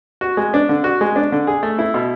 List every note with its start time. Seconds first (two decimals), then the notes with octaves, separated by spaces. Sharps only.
0.21 F#4
0.37 G#3
0.54 D4
0.69 D3
0.84 F#4
1.01 G#3
1.16 D4
1.32 D3
1.47 G#4
1.63 A3
1.79 E4
1.94 B2